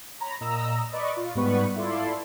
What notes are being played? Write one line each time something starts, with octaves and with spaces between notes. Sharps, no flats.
C#5 A#5 B5
A#2 D#5 A#5 E6
B4 D5 D#5 B5 C#6 D6
F4
G#2 G3 B3 B4 C#6
E4 F4 A4 D5 C6